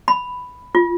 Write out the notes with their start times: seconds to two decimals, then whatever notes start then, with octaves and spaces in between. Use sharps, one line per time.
0.08 B5
0.75 F4